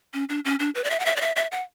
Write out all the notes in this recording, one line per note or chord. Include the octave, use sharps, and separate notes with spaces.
C#4
D4
C#4
D4
B4
D5
E5
F#5
E5
D5
E5
E5
F#5